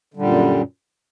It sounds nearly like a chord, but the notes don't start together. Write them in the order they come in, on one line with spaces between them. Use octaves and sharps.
D3 G3 A#2 F#2